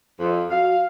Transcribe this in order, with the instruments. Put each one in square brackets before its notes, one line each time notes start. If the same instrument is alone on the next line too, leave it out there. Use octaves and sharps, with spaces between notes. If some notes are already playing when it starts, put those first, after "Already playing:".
[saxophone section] F2
[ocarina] F#4 [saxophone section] F5